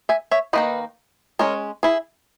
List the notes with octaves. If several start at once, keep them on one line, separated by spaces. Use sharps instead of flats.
E5 G#5
C#5 E5
D#3 A#3 D#4 B4 D#5
G#3 C#4 A#4 C#5
E4 G#4